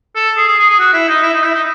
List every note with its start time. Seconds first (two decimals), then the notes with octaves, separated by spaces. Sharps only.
0.15 A4
0.37 G#4
0.48 G#4
0.59 G#4
0.69 G#4
0.80 F#4
0.93 E4
1.08 D#4
1.22 E4
1.33 D#4
1.43 E4
1.54 D#4